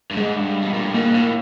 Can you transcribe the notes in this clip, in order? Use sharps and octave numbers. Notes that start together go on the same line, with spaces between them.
G2
G#2 G#3
G2
B2
A#2
A2
G#2 A#3
A2